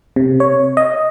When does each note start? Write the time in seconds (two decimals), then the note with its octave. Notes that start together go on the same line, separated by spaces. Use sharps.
0.16 C3
0.40 C#5
0.77 D#5